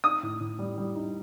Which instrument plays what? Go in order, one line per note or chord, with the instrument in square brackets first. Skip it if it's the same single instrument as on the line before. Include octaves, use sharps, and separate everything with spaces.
[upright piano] D#4 [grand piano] D#6
[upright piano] A2
A2
G3
G3
D#4